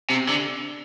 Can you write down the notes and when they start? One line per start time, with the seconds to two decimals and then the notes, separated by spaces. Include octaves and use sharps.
0.10 C3
0.28 D3